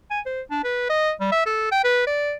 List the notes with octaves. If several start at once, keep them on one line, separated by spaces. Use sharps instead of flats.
G#5
C5
D4
B4
D#5
G3
E5
A4
G5
B4
D5